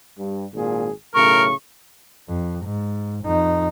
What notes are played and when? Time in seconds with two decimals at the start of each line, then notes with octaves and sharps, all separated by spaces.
0.18 G2
0.53 G#1 A#2 G#4
1.14 B1 A2 C#3 A#4 C#6
2.28 F2
2.64 G#2
3.25 F2 D#4